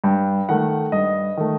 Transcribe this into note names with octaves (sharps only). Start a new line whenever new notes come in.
G2 G5
D#3 A3 F#5
G2 D#5
D#3 A3